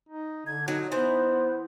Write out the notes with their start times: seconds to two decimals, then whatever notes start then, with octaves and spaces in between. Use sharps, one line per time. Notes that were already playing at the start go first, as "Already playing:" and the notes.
0.09 D#4
0.46 D3 G#6
0.68 F#3 D#4
0.92 E3 B3 C5